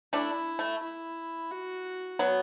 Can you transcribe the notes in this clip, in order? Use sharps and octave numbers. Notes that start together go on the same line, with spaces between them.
A3 D4 E4
A3
E4
F#4
F#3 B3